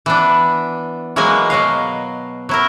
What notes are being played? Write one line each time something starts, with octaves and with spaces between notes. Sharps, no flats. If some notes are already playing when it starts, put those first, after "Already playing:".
E3 B3 D4
E3 F#3 G#3 A#3 D#5 G#5
B2 F#3 D#5 F5
F#3 E4 A#4